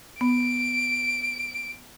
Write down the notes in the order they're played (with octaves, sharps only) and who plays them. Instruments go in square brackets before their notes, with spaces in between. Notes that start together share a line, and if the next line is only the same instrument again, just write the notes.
[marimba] B3 [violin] D7